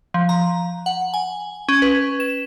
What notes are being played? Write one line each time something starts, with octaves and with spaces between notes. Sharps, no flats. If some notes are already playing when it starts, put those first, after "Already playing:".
F3
A#5
F#5
G#5
C#4
B4
E7